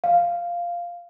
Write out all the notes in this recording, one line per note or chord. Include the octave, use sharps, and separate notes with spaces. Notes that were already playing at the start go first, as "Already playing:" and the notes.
F5